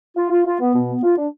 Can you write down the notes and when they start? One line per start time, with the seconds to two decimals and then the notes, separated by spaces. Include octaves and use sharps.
0.17 F4
0.30 F4
0.46 F4
0.60 B3
0.74 B2
0.88 B3
1.03 F4
1.17 D4